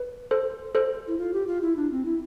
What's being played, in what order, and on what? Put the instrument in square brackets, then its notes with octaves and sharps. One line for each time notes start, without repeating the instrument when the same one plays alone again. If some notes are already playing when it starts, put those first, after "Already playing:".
Already playing: [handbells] B4
A4 C5
A4 C5
[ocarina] E4
F4
G4
F4
E4
D4
C4
E4